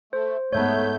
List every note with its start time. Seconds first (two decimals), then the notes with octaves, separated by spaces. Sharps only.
0.13 A3 C5
0.53 G#2 A3 B3 C#5 E5 A5 G6